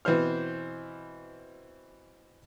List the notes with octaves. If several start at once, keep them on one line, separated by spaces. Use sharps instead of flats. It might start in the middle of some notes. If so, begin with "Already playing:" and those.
B2 E3 C4 C5 F6